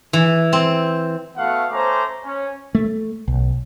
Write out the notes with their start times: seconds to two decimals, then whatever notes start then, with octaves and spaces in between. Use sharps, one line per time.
0.13 E3
0.53 C4
1.37 A3 B3 F#4 F5 F#5
1.71 A3 C#4 C5 A#5 D6
2.24 C#4
2.75 A3
3.28 B1